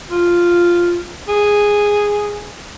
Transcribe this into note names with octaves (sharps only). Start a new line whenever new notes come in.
F4
G#4